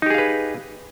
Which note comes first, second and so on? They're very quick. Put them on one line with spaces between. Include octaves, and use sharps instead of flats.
D#4 G4 G#4 F5 B4